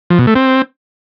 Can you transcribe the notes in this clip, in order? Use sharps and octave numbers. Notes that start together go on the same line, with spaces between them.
F3
B2
A3
C4